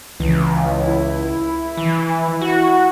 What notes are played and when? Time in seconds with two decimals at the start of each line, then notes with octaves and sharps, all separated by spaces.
0.20 C#2 E3
0.83 E4
1.77 E3
2.42 F#4